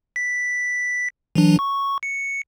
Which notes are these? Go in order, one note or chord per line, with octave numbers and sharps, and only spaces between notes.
B6
E3 F#3 D4
C#6
C#7